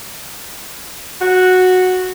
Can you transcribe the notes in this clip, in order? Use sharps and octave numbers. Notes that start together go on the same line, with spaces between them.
F#4